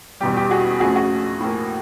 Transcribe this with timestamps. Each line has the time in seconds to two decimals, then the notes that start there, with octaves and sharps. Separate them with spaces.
0.20 E2 B2 G3 G4
0.36 G4
0.51 F#4 G#4
0.80 F2 C#3 F3 A3 F#4 G#4
0.95 F#4 G#4
1.40 A2 F3 A#3